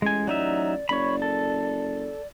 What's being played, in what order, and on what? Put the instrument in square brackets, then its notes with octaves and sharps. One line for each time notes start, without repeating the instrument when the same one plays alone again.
[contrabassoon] A1 [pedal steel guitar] G#3 G#5
[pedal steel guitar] F#3 D#4 E5 [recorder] D5
[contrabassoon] F#1 [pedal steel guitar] C#5 B5 [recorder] D5
[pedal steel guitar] A4